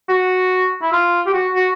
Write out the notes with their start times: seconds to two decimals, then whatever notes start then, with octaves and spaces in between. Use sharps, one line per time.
0.09 F#4
0.82 E4
0.92 F4
1.26 G4
1.34 F#4
1.54 F#4